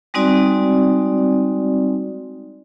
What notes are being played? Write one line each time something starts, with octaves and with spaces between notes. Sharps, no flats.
G3 G#3 C4 D#4 F#4 D5